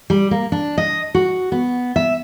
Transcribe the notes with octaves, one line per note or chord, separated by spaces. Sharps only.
G3
A#3
D4
D#5
F#4
B3
E5